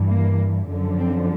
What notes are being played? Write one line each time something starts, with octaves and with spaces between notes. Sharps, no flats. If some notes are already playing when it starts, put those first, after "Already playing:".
Already playing: G2 E3
A#3
F#2 D3 F3
C4